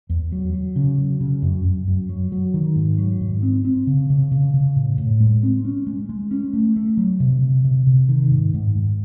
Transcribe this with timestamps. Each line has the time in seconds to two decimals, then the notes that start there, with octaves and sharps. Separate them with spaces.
0.09 E2
0.32 F#3
0.54 F#3
0.76 C#3
0.98 F#3
1.21 C#3
1.42 F#2
1.65 F#2
1.88 F#2
2.09 F#3
2.32 F#3
2.54 D#3
2.76 G#2
2.98 F#3
3.21 G#2
3.43 C4
3.65 C4
3.87 C#3
4.10 C#3
4.32 C#3
4.54 C#3
4.76 A2
4.98 A2
5.20 G#3
5.43 C4
5.65 C#4
5.87 G#3
6.09 G#3
6.31 C#4
6.54 A3
6.76 A3
6.97 F#3
7.20 C3
7.42 C3
7.64 C3
7.87 C3
8.09 D#3
8.31 G#2
8.54 G#2
8.75 G#2